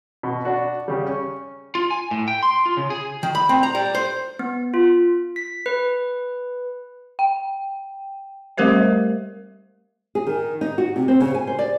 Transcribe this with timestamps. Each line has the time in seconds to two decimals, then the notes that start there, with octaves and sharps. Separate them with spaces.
0.23 B2
0.45 D4 F#4
0.88 C#3 G3
1.07 C#4
1.75 F4
1.91 G#5
2.11 A2
2.28 G5
2.43 C6
2.66 F4
2.77 C#3
2.90 G#4
3.23 D#3
3.35 B5
3.49 C4
3.63 A#5
3.75 G3
3.95 C5
4.39 B3
4.74 F4
5.36 B6
5.66 B4
7.19 G5
8.57 G3 A3 G4 A#4 C5 E5
10.15 G#4
10.27 D#3
10.61 D#4
10.78 F#4
10.96 C3
11.08 C4
11.21 C#3
11.35 G#5
11.47 C5
11.59 D5